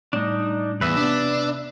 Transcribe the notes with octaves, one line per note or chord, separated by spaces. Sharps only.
A2 G3 A3 D4 D#4
E2 B4 E5
C3 B3 D4